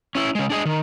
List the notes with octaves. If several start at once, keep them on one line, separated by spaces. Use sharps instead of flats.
C#4 E4
C#3 G#3
D4 G#4 D#5
D#3